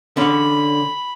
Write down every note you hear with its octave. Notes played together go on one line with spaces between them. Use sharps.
D3 C#4 B5